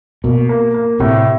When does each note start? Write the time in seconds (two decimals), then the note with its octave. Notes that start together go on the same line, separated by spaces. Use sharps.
0.24 B2 A#3
0.49 A#3
0.74 A#3
1.00 A2 C3